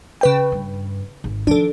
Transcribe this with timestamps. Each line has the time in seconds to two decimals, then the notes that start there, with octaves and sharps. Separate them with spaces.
0.21 C#3 B4 G5
0.52 G2
1.24 G#1
1.47 D#3 F3 D4 A4